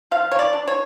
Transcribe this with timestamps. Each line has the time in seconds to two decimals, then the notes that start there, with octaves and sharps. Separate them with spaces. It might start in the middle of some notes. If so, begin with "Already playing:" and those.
0.11 F3 F5
0.31 C#5
0.39 D5
0.53 D4
0.67 C#5